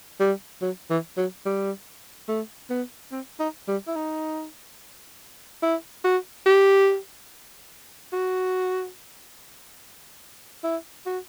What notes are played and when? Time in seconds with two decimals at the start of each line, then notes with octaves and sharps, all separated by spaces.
0.20 G3
0.62 F#3
0.90 E3
1.17 F#3
1.46 G3
2.28 A3
2.70 B3
3.12 C4
3.39 D#4
3.68 G3
3.87 E4
3.96 D#4
5.62 E4
6.04 F#4
6.46 G4
8.13 F#4
10.64 E4
11.06 F#4